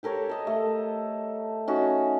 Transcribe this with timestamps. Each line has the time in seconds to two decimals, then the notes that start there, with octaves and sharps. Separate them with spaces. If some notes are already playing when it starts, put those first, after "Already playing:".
0.03 G4 A4 A#4 C#5
0.29 A4 D#5
0.47 A3
1.68 C#4 D#4 F#4